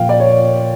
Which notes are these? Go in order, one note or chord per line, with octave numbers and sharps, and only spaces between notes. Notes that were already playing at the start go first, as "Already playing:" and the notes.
Already playing: A#2 F3 F5 G5
D5
C#5